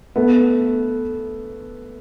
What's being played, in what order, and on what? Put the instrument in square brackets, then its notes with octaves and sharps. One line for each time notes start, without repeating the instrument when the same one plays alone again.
[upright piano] A3 B3